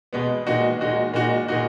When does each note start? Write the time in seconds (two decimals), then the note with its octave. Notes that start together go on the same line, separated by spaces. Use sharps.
0.13 B2 G#3 B3
0.47 A#2 G#3 D#4 F#4
0.81 A#2 G#3 D#4 F#4
1.14 A#2 G#3 D#4 F#4
1.48 A#2 G#3 D#4 F#4